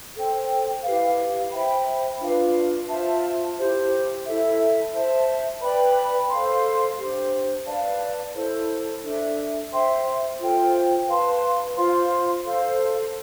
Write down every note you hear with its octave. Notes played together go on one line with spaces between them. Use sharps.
A4 C5 G5
E4 G4 B4 F5
C5 E5 G5 B5
D4 F4 B4 F5
F4 C5 E5 A5
E4 G4 C5
E4 A4 E5
C5 E5 A5
B4 D5 G5 B5
A4 C5 F5 C6
D4 G4 C5
B4 D5 F5 A5
E4 A4 C5
D4 A4 E5
C5 E5 G5 C6
F4 A4 C5 G5
B4 F5 A5 C6
F4 C5 F5 C6
A4 C5 F5